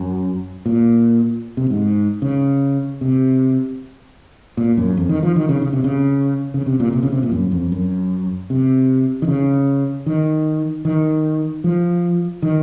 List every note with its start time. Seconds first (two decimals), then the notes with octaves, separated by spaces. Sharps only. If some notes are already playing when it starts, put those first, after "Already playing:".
Already playing: F#2
0.66 A#2
1.57 C3
1.70 G#2
2.22 C#3
3.01 C3
4.57 A#2
4.77 F#2
4.97 F2
5.09 D#3
5.23 F3
5.36 D#3
5.49 C#3
5.62 C#3
5.73 C3
5.84 C#3
6.54 C#3
6.66 C3
6.80 A#2
6.93 C3
7.03 C#3
7.12 C3
7.23 A#2
7.32 F#2
7.52 F2
7.72 F#2
8.50 C3
9.22 D#3
9.28 C#3
10.06 D#3
10.85 D#3
11.64 F3
12.42 D#3